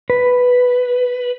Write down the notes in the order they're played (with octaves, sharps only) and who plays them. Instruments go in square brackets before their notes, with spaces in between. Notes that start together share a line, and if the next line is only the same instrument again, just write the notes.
[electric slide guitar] B4